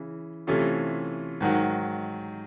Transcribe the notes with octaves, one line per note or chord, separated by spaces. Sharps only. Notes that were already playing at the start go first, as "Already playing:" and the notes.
Already playing: C#3 E3
C3 E3 A3 C#4 F4
G#2 D#3 F#3